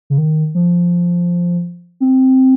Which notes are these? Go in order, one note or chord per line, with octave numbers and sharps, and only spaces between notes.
C#3
D#3
F3
C4